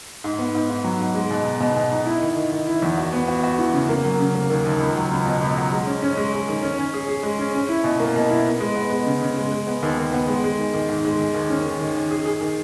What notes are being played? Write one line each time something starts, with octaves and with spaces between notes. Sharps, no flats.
G#2
B3
G#2
G#2
F#3
G#2
G#3
B2
D#4
B2
B2
D#4
E4
D#3
D#3
D#3
E4
E2
F#4
B3
F#4
F#4
E3
C#3
A#3
F#3
C#3
A#3
D#2
D#2
C#2
F#3
C#2
B2
C#2
F#3
G#3
C#4
C#4
G#3
G#3
D#3
C#4
C#4
G#4
G#4
G#3
C#4
C#4
E4
B2
A#3
B2
E4
B3
G#3
B3
G#3
C#3
C#3
G#3
G#3
B3
D#2
D#2
B3
G#3
G#3
D#3
D#3
G#2
G#3
D#3
D#2
C#4
D#3
D#3
D#3
G#4
G#4
D#3